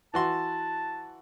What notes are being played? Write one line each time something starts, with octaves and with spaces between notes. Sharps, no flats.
E3 F#4 A5 C6